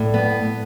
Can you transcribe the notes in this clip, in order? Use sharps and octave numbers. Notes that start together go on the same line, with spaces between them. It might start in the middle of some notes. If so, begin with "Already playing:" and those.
Already playing: A2 D5
B3